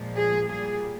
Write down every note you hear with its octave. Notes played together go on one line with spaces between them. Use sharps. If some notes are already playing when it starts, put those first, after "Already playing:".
Already playing: A#2 F3 G#3
G#4
A#2 G3 G#4